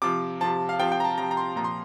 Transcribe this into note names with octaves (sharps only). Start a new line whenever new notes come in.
C3 F3 D6
C3 F3 A5
F5
C3 F3 G5
G5
A#5
A5
C3 F3 A#5
A#5
C6
A#2 F3 A#5
C6